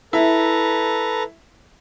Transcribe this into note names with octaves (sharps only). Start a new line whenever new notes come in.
E4 A4 B4 A#5